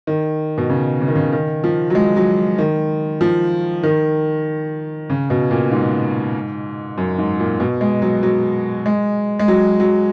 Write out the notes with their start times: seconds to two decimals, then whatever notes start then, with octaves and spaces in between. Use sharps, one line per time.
0.07 D#3
0.58 B2
0.69 C#3
1.02 C#3
1.08 D#3
1.16 C#3
1.32 D#3
1.64 F3
1.90 F#3
1.95 G#3
2.16 F#3
2.58 D#3
3.21 F3
3.83 D#3
5.10 C#3
5.30 B2
5.51 A#2
5.72 G#2
6.98 F#2
7.18 G#2
7.40 A#2
7.60 B2
7.81 G#3
8.02 F#3
8.23 F#3
8.86 G#3
9.39 G#3
9.48 F#3
9.80 F#3